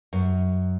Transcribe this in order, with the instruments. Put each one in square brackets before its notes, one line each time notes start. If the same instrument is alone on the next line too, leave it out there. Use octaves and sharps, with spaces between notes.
[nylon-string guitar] F#2